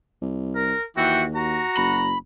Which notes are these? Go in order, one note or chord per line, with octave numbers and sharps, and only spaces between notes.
C2
A#4
D#2 E3 E4 F#4 G5
F#4 A#5
F#1 B5